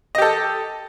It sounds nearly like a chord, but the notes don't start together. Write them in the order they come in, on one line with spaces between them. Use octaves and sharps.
D#5 G4 A4